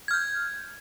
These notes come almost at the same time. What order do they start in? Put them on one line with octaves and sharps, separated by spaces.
G#6 F6 G6